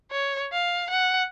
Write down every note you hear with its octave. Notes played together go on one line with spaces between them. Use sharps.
C#5
F5
F#5